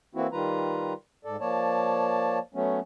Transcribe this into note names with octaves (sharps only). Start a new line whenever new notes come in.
E3 A#3 C4 E4 F#4
D#3 G3 F4 B4 A#5
G#2 A4 D5
F3 A#3 C#5 D5 A5
F#3 A3 B3 C#4